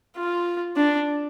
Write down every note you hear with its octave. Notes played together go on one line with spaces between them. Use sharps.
F4
D4